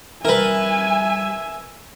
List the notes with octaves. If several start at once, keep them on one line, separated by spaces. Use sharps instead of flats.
G3 E4 A#4 B4 E5 G#5